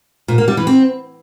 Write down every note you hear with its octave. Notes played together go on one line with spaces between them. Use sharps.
A#2
A#3
G3
E3
C4